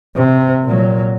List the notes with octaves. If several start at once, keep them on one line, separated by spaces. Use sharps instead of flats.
C3
A#2 F#3